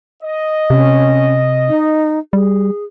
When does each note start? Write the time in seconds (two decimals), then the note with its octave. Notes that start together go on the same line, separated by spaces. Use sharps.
0.23 D#5
0.70 C3 C#4
1.69 D#4
2.33 G3 G#4